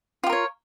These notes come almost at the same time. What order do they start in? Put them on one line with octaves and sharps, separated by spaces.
F4 G4 A#4 C#5